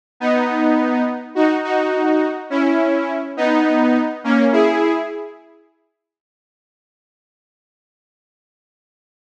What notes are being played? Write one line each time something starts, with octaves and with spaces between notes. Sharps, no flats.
B3 D#4
D#4 F#4
D#4 F#4
C#4 E4
B3 D#4
A#3 C#4
E4 G#4